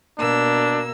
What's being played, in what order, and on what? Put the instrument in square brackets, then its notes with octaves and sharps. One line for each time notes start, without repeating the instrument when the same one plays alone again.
[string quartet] B2 A#3 E6 [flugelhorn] D4